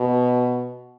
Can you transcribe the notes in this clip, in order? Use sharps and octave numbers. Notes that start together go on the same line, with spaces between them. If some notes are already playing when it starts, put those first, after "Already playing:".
Already playing: B2